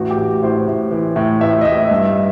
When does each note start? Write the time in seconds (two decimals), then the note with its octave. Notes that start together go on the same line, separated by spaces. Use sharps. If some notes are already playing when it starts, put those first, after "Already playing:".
Already playing: A1 F#4
0.10 G4
0.18 A1
0.43 A2 C5
0.68 A2
0.91 E3
1.16 A2
1.41 A1 E5
1.61 D#5
1.65 A2 E5
1.91 G2